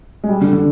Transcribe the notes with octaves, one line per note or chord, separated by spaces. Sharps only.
G#3
G3
D3
D3